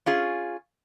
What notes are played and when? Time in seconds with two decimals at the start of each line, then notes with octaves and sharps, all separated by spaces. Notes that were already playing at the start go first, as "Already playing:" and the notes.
0.06 C#4 F4 G#4